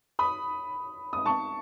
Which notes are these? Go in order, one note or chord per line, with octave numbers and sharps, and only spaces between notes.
B5 D#6
D#6
A5 C#6